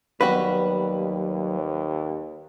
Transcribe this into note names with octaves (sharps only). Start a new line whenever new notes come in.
D#2 F#3 G3 B3 F#4 B4